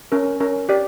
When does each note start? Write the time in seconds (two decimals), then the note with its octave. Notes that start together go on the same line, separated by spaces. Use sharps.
0.12 C#4 A#4
0.40 C#4 A#4
0.69 G4 D5